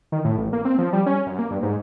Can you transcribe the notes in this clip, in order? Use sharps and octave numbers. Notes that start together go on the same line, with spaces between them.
D#3
A2
A1
A#3
C4
F3
G3
C#4
F#2
A#3
G2
G#2